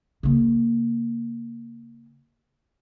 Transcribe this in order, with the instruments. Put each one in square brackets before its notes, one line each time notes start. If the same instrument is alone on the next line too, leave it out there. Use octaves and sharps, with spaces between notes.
[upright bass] C#3 A#3